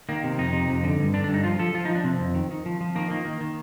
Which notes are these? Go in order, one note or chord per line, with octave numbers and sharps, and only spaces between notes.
D#3 A#3
C3
F2 D#4
C3
F2
D3
G2
D3 D4
D4
G2
D#4
F3 F4
F3 A4
F3 F4
D#4
F3
D4
C3 C4
F2
D#3
D#3
F3
F3
D#3 A#3
D#3 A#3
D#3
D#3